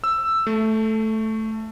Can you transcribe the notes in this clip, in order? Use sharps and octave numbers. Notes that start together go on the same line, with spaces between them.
E6
A3